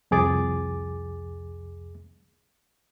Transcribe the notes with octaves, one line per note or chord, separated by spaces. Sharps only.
C2 F2 G#4 D6 A6